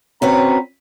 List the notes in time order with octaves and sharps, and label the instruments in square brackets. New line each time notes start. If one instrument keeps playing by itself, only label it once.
[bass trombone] C4 [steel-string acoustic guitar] C#4 F#4 B4 [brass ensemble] A#5